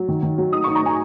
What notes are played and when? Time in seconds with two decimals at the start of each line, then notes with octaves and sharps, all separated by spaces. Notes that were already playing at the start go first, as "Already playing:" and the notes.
Already playing: F#3
0.08 D#3
0.22 D#3
0.38 F#3
0.52 D#4 D#6
0.64 D#4 C#6
0.75 A#5
0.83 D#4 G#5